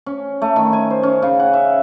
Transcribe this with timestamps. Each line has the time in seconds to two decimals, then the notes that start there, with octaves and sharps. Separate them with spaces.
0.06 C#4
0.42 A3
0.56 D#3
0.73 G#5
0.90 C5
1.03 C#4
1.22 C#3
1.40 F#5
1.54 E5